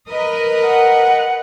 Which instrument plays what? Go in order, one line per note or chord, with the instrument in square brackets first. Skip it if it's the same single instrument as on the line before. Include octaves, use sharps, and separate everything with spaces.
[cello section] A#4 B4 D#5
[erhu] F#5